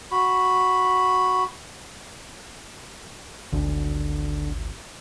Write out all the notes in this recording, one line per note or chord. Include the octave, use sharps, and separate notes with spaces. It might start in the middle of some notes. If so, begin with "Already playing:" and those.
F#4 B5
G#1 D2 D3